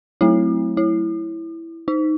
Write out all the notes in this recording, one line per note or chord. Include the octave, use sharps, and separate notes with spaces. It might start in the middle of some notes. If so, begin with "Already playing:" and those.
F#3 A3 C4 E4
E4
D#4